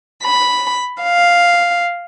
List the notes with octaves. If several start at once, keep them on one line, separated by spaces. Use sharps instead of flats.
B5
F5